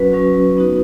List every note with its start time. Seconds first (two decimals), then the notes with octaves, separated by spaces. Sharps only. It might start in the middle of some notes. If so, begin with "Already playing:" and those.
Already playing: F#3 C#4 F#4 B4
0.12 F#3 C#4 F#4
0.57 B3 D#4 F#4